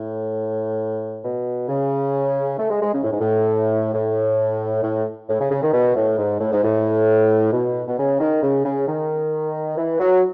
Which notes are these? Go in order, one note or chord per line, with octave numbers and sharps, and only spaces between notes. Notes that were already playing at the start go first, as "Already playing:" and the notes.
Already playing: A2
B2
C#3
A3
G#3
G#3
C#3
A2
G#2
A2
A2
A2
A2
C#3
C#3
D#3
B2
A2
G#2
A2
G#2
A2
B2
B2
C#3
D#3
C#3
C#3
D#3
E3
F#3